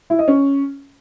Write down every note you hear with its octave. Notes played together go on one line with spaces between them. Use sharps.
E4
D#5
C#4